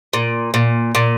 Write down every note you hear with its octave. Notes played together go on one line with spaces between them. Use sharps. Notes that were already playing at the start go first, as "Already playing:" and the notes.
A#2
A#2
A#2